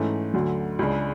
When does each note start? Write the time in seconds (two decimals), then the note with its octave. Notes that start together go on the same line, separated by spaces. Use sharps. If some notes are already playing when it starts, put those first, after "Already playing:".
Already playing: G#2 E3 A3 C#4
0.34 D2 D3 F#3
0.79 C#2 C#3 G#3 D4